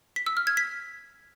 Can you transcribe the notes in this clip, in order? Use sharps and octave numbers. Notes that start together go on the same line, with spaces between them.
B6
E6
F6
G#6
B6